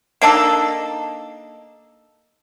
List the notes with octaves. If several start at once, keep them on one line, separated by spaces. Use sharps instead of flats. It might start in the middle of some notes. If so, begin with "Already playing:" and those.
A#3 D4 D#4 A4